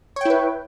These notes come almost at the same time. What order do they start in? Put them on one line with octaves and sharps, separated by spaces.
C#5 G5 E4 B4